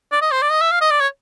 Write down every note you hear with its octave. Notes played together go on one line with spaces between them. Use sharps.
D5
D#5
C5
D5
D#5
E5
F5
D#5
D5
C#5